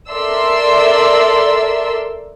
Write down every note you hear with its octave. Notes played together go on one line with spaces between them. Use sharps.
A4 A#4 D5 E5 C6 E6